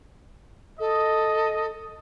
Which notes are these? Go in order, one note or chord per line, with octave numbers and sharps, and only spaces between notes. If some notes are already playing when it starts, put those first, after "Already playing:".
A4 D#5